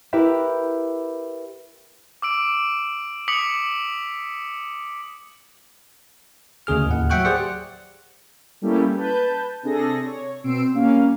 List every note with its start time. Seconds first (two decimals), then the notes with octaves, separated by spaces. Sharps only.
0.13 E4 G4 A#4 B4 E5
2.22 D6 E6 D7
3.28 D6 D#6 B6 C#7 F#7
6.67 D2 C#3 G#4 F6
6.86 D#2 A2 F#5
7.10 F#3 E5 F#5 G5 C#6 F#6
7.25 G4 G#4 C5 D5 F#5
8.62 G3 A3 A#3 C#4 E4 G4
8.95 B4 A5 G6
9.63 C3 D4 G#4 A4 A#6
10.06 C#5
10.44 B2 C4 E6 C7 D7
10.74 G3 A#3 C#4 F5